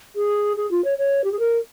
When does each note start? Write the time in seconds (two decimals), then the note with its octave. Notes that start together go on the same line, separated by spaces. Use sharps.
0.16 G#4
0.57 G#4
0.71 F4
0.84 C#5
0.98 C#5
1.24 G4
1.32 G#4
1.39 A#4